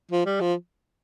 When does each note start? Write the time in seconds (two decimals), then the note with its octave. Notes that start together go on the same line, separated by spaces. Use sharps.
0.11 F3
0.26 G3
0.41 F3